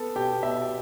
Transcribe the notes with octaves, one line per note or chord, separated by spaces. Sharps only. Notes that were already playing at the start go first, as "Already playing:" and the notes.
Already playing: B3 A4 A5
B2 G4 G5
B2 E5